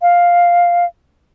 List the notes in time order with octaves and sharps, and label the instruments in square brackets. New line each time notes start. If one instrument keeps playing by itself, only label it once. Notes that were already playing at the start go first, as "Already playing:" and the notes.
[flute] F5